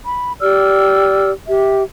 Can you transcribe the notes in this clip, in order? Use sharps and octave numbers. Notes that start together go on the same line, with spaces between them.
B5
G4 D5 E6 F6
G4 E5